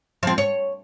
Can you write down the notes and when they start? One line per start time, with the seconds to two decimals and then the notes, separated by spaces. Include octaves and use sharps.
0.23 F3 C4
0.38 C#5